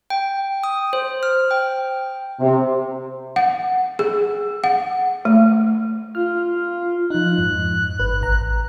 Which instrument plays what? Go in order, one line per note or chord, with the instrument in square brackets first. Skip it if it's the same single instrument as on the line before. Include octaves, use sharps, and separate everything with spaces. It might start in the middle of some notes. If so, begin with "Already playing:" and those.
[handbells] G5
D#6
C5
F6
G5
[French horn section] C3
[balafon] F#5
G#4
F#5
A3
[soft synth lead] F4 [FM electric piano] F6
[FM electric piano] F3 D#4 [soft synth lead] F#6
[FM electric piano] F2 G#2
G1 B4
A1 A#5